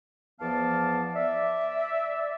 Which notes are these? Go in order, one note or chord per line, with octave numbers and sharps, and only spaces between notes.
E2 F3 B3 D5 F5 A5
D5 E5